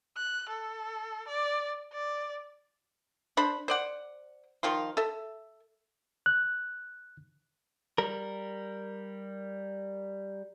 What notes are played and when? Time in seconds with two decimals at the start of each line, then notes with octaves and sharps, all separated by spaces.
0.17 F#6
0.49 A4
1.28 D5
1.93 D5
3.37 D4 C5 B5
3.68 C5 D5 F#5
4.63 D#3 F3 F4 C6
4.97 A4 E5
6.26 F#6
7.98 G3 A#4